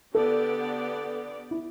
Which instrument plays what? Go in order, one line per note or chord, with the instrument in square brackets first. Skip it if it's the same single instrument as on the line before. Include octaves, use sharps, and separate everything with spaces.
[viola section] D3 B3 G4 D5 [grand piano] A4
[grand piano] E4